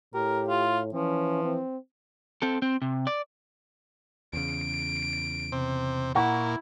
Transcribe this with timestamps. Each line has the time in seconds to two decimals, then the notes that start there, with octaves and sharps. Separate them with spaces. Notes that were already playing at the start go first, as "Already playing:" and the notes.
0.14 A2 G4 A#4
0.49 F4
0.94 E3 F3 C#4
1.44 C4
2.42 C4 A4
2.62 C4
2.82 C3
3.07 D5
4.33 E2 C#3 D7
5.52 C3
6.15 A#2 E4 F#5 A#5 C#6